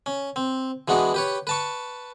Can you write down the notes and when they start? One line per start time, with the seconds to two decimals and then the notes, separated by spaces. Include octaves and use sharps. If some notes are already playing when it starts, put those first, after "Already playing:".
0.06 C#4
0.36 C4
0.88 E3 G#3 B3 D4 F#4
1.14 G4 B4 C#5
1.47 B4 A5 C#6